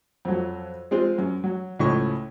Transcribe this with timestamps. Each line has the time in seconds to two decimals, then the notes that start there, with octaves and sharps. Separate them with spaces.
0.25 F2 F#3
0.91 G#3 C4 F4
1.18 F#2
1.44 F#3
1.79 C#2 A2 F3 C#6